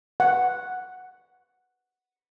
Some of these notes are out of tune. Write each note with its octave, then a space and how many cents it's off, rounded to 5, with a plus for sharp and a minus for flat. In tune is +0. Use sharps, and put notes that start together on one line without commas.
F#5 +0